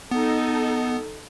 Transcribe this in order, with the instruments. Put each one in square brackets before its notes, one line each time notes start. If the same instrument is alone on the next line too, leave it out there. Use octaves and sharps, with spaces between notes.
[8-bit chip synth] B3 [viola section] D#4 A4